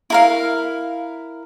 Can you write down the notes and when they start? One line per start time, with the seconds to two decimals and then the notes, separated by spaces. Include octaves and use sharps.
0.10 E4 A#4 F5